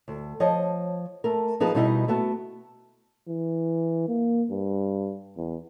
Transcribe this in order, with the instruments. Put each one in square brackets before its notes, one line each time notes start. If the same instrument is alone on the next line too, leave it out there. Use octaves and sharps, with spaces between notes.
[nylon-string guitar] D2
F3 C#5 D#5
A3 A#4
F3 D#4 G#4 B4
B2 G3 D#4 E4 D#5
A3 B3 F#4
[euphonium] E3
A#3
G2
E2